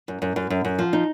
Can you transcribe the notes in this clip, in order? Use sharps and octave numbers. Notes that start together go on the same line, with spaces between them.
F#2
F#2
F#2
F#2
F#2
F3
D#4